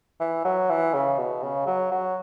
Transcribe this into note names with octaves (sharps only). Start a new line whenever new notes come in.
E3
F#3
E3
C#3
B2
C#3
F#3
F#3